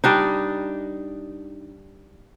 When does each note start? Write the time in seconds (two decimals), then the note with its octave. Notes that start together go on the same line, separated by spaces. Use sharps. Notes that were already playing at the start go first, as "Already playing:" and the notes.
0.04 G3 D4 D#4